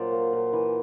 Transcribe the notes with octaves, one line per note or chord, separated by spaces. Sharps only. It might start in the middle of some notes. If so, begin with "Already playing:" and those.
Already playing: A#2 F#3 C5 D5
A#3
A#2
E3